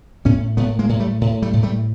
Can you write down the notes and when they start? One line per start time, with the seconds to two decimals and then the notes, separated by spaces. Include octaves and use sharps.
0.25 A2 B3 C#4
0.57 A2 A3 B3
0.79 G#3 A#3
0.89 A2
1.00 G3 A3
1.21 A2
1.42 G3 A3
1.53 A2
1.63 G3 A3